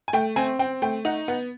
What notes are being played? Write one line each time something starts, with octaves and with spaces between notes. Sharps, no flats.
G#5
A3 G5
C4 G#5
C4 G5
A3 G5
D#4 F#5
B3 F#5